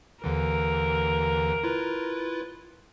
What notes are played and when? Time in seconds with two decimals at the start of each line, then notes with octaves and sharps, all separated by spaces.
0.24 D#2 D3 E3 A#4
1.63 E4 F4 B4